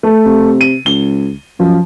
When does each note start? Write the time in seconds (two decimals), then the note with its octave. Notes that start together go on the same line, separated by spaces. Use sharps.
0.03 A3
0.26 C3
0.61 D#7
0.86 C#2 G7
1.60 F#2 F3